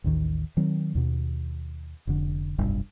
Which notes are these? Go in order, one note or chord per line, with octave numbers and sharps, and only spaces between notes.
A1 D#2 D#3
D#3 F#3 C4
D#2 B2
F1 D3
F1 B1 G2